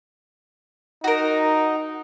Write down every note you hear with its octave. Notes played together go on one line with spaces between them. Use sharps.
D#4 F#4 A#4